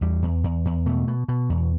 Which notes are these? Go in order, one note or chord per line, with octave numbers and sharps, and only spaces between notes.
E2 G3
E2
E2
E2
B2 A3
B2
B2
E2